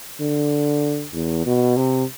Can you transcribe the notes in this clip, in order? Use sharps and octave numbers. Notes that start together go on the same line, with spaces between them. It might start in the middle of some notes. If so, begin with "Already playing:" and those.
D3
E2
B2
C3